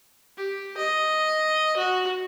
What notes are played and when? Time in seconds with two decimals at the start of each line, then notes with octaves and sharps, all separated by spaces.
0.38 G4
0.77 D#5
1.77 F#4